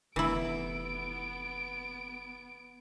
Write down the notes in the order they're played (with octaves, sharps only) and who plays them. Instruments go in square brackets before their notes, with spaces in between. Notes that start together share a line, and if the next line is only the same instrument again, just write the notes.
[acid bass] F1 [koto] E3 E4 [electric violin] B3 D7